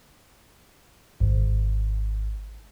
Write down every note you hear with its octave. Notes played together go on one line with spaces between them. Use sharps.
G#1